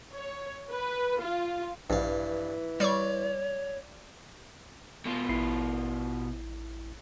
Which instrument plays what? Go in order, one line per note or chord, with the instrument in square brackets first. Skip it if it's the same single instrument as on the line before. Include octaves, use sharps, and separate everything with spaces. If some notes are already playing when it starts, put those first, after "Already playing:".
[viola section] C#5
B4
F4
[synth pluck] A#1 [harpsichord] G2 F5 [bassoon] E3
[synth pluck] G3 C#6 [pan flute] C#5 [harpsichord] D5 C6
[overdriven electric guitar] B2 F4
[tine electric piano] A1 E4 C7